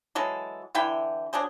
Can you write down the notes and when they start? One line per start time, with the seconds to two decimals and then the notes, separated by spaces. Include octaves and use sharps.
0.15 E3 F#3 G#3 A4
0.75 D3 E3 E4 G5
1.33 F#3 D4 G#4 C5